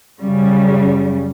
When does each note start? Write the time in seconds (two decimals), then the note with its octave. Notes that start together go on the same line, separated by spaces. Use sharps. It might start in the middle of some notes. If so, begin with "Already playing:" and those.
0.21 F#2 C#3 G3